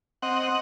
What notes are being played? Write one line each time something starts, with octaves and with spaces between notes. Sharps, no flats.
C4 D#5 F#5